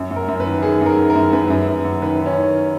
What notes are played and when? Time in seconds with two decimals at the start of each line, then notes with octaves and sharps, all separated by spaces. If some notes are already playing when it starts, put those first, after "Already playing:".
Already playing: F#2
0.11 F#2
0.16 A#4
0.28 F#2
0.40 B4
0.46 D#3
0.62 D#3 G#4
0.81 F#2
0.86 A#4
0.98 D#3
1.10 A#4
1.15 F#2
1.33 F#2 B4
1.50 F#2
1.68 F#2
1.85 F#2
2.02 D#3 B4
2.20 D#3
2.26 C#4
2.37 D#3